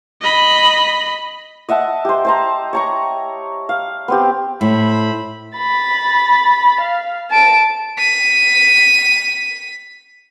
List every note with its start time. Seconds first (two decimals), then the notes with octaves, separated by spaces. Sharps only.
0.21 D#5 B5
1.69 D#5 E5 F#5 A5
2.05 G4 C5
2.25 C5 A5 A#5
2.73 C#5 A#5 C#6
3.69 F5
4.08 B3 C4 G4
4.61 A2 C5 E5 B5
5.58 B5 A6
6.81 F5
7.30 A5 D7
7.98 B6 D#7